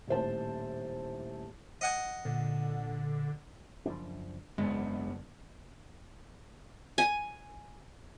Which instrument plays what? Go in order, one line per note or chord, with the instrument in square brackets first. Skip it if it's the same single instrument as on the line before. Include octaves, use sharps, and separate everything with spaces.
[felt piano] D#1 A2 C5 A5
[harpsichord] D#5 F#5 G#5
[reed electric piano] A#2 [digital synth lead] D3
[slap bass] F#1 F3 D4
[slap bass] F#1 E2 [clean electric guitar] G#2 B3 D4 [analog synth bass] G#3
[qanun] G#5